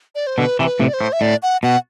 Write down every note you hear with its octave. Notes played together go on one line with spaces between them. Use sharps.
D5
C5
B2 D3 B4
C3 E3
B4
A2 C3
D5
C5
A2
E5
A2 D5
F#5
B2 F#5